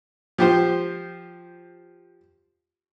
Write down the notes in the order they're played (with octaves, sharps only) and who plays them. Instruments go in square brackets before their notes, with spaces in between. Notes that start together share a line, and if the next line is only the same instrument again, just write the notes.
[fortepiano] F3 G4 C5